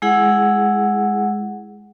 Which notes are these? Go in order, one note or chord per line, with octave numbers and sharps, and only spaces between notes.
G#3 E4 G#4 F#5